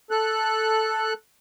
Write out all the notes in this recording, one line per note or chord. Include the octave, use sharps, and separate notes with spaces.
A4 F#6